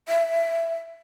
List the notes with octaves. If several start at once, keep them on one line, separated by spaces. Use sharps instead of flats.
E5